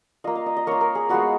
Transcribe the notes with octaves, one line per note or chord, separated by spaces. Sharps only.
A#3 F4 D#5
F5
D#5
D#5
A#3 F4 C#5
A#4
G#4
G#3 B3 F4 F#4